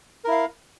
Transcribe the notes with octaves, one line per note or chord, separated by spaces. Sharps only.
E4 A#4 F5